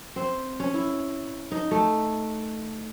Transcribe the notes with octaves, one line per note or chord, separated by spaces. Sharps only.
C4
C#4
E4
D#4
A3